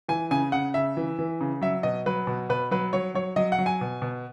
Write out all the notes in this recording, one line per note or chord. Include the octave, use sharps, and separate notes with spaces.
E3 G#5
C#3 G#5
C#3 F#5
C#3 E5
E3
E3
C#3
F#3 E5
B2 D#5
F#3 B4
B2
B2 B4
F#3 B4
F#3 C#5
F#3 C#5
F#3 D#5
F#5
F#3
G#5
B2
B2